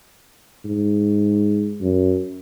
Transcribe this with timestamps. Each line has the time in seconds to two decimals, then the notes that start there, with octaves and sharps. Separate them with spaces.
0.65 G#2
1.81 F#2